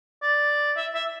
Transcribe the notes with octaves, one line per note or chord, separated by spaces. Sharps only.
D5
E5
E5